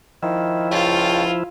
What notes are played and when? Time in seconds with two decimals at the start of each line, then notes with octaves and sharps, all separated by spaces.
0.23 D#3 F3 E4
0.71 C#2 F4 C#5 G5 A5